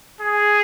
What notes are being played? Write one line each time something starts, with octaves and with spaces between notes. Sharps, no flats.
G#4